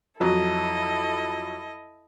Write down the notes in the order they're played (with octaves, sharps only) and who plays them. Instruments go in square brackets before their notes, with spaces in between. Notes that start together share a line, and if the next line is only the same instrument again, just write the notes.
[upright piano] F2 F#3 [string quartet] E4 A4 D#5